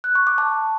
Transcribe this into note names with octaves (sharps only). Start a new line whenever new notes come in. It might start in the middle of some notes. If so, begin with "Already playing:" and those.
F#6
C#6
D6
A5